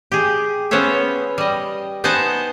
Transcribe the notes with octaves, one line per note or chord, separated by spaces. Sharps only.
G4 G#4
B3 C#4 C5 C#5 E5
G3 D#5
B3 D#4 C5 F#5 G#5 A5